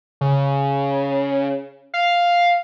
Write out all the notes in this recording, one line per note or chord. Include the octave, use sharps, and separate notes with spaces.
C#3
F5